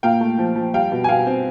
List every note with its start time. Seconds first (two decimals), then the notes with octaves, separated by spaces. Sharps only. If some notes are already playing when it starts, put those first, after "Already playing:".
0.03 A#2 F5 G5
0.21 A3
0.39 F3
0.56 F3
0.74 G3 F5 G5
0.92 B2
1.04 G#5
1.09 B2 F5 G5
1.27 C4